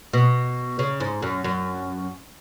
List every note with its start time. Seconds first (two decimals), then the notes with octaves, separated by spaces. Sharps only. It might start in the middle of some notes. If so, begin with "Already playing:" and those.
0.13 B2
0.79 C#3
1.00 G#2
1.22 F#2
1.44 F#2